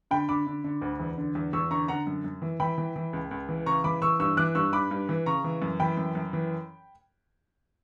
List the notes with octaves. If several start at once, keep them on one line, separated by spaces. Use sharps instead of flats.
D3 G5 B5
D3 B5 D6
D3
D3
D2
E2
D3
E2
E2 C#6 E6
D3 A#5 C#6
D3 F#5 A#5
F#2
F#2
E3
E3 G5 B5
E3
E3
C#2
C#2
E3
C#3 A#5 C#6
E3 B5 D6
E3 C#6 E6
G2 C#6 E6
E3 D6 F#6
G2 C#6 E6
G2 B5 D6
G2
E3
C#3 A#5 C#6
E3
F#2
E3 G5 B5
F#2
F#2
E3